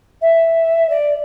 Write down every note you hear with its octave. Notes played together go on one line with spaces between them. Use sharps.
E5
D5